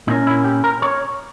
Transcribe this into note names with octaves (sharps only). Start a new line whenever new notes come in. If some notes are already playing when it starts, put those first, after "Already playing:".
A#2 A#3 C#4 D#4
E4
G4
A#4
C#5